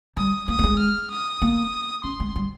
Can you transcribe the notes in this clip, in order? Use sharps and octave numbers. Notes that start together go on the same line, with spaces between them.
G3 D#6
A#3 D#6
A#3
G#3
F6
D#6
A#3
C#4 C6
G#3
G3